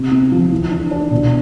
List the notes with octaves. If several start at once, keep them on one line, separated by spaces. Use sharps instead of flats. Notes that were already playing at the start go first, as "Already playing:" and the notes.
Already playing: C3
C4
F3
E3
D4
D4
B2